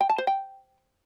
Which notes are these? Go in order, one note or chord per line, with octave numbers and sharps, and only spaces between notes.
G5
A5
C5
G5